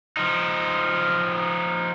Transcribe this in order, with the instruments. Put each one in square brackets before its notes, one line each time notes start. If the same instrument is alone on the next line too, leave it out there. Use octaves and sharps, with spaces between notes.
[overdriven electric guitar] F3 D#4